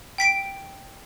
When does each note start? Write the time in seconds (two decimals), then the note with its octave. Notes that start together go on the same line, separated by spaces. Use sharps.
0.18 G5 B6 D7